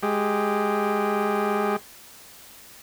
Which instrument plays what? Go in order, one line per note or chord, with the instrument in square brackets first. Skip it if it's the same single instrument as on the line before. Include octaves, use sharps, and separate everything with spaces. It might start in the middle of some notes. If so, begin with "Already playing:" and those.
[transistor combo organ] G#3 G4